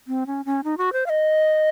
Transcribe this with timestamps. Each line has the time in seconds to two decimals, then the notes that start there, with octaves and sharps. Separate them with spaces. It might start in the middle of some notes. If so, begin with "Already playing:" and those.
0.08 C4
0.27 C#4
0.46 C#4
0.64 D#4
0.78 F#4
0.93 C5
1.06 F5
1.10 D#5